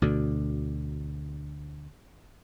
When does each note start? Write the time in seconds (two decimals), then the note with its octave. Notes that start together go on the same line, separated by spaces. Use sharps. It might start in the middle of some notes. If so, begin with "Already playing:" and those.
0.02 D2 B2 D3